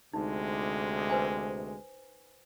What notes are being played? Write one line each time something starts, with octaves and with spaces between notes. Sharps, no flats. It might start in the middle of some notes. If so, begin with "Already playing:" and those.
D2 C3 G#3 D#4
B4 C5 G#5